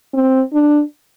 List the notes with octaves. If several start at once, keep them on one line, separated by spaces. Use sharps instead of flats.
C4
D4